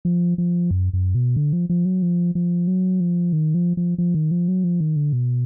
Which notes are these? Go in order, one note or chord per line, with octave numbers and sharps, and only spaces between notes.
F3
F3
F#2
F#2
B2
D3
F3
F3
F#3
F3
F3
F#3
F3
D#3
F3
F3
F3
D#3
F3
F#3
F3
D#3
D3
B2